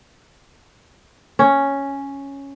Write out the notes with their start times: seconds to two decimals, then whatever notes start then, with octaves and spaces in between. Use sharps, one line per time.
1.39 C#4